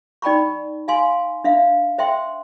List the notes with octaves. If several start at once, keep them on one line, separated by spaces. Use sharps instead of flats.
D#4 D5 G5 A5 B5 C#6
F5 G#5 C6
D4 E5 F5
C5 E5 G5 C6